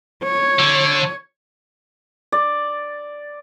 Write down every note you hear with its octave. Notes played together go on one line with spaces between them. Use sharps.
C#5
D3
D5